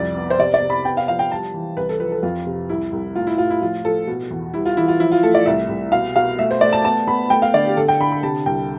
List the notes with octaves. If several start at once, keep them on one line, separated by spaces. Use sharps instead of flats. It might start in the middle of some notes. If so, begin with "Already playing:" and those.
Already playing: C2 F2 D5
B3
C5
C3 D5
D5
C3
B5
B3 G5
F5
F3 F5
G5
G3 A5
E3
C2 B4
A4
F3 B4
A4
F2 F4
C3
C2 E4
C2
A2 F4
E4
A2 F4
E4
F3 F4
F3 A4
B2
E2
G3 E4
F4
E3 E4
F4
F3 E4
F4
A3 A4
D5
C2 E5
C2
B2 F5
B2 F5
A3 E5
C5
A3 D5
A5
B3 A5
B3 B5
A3 G5
F5
D3 D5
G4
D3 A4
G5
D3 B5
B5
C3 A5
C2 G5